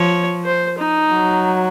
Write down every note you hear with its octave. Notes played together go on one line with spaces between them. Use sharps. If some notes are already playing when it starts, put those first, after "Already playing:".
Already playing: F3 C#5
C5
D#4
F#3